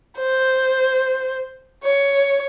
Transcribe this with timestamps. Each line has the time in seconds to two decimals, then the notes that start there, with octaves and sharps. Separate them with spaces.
0.18 C5
1.83 C#5